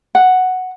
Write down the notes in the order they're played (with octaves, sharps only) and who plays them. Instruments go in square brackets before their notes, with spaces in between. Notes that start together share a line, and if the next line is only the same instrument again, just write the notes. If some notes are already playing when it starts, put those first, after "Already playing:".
[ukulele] F#5